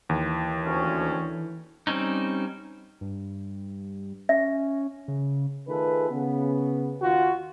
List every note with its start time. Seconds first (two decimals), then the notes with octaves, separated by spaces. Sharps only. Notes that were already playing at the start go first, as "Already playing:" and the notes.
0.09 D#2 E3
0.66 D2 C#4
1.87 G3 C4 C#4 D#4
3.01 G2
4.29 C#4 E5
5.08 C#3
5.68 D#3 A3 F4 G#4 A4 B4
6.10 C#3 B3
7.02 D#2 F4 F#4